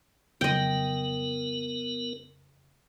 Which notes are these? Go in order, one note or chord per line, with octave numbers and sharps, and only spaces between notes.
F2 C#3 F#3 B3 A#4 D#5 G5